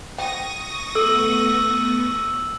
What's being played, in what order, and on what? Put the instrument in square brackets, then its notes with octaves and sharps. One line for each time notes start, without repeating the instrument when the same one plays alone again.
[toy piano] G5 [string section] C#6 D#6 A#6
[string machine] A3 B3 [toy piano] A4 [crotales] E6